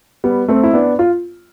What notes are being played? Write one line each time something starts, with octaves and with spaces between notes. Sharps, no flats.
G3 B3
A3 C4
E4
B3 D4
F4